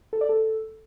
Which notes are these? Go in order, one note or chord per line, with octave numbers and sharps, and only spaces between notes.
A4
D5
A4